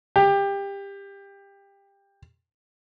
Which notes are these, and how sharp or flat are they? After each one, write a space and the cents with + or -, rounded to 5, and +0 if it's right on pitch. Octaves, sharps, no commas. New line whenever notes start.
G4 +20